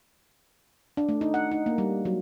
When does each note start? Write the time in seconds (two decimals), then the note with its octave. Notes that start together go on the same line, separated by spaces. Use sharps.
0.97 D4
1.09 A3
1.21 D#4
1.34 F#5
1.51 D#4
1.66 A#3
1.78 G3
2.05 F#3